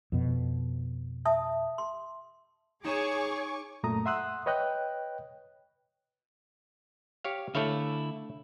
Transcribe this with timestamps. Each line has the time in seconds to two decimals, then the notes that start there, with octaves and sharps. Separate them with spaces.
0.12 F2 B2
1.25 E5 A5 D#6
1.78 C6
2.84 D#4 G#4 C#5 G#5 C#6 D6 E7
3.83 F#2 A#2 A3 A#5 D#6
4.06 E5 F#5 C6 D#6 E6 F#6
4.46 B4 C#5 D#5 G5 F#6
7.24 G4 C#5 F5
7.55 D3 A3 E4 C#5 F5